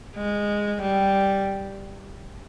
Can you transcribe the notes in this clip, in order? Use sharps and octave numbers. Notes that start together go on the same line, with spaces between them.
G#3
G3